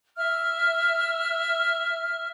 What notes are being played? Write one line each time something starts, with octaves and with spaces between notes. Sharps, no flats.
E5 F6